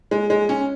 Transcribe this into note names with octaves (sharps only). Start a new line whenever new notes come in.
G#3
G#3
C#4